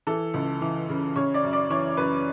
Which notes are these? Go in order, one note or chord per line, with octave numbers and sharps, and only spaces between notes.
E3 A4
C#2
E3
C#3
C#3 C#5
D5
F#2
D5
E3 C#5
F#2 B4